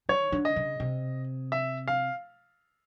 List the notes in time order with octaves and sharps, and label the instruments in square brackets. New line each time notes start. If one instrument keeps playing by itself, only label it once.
[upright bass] D#3 [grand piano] C#5
[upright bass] D3
[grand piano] D#5
[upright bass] C#3
C3
[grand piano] E5
F5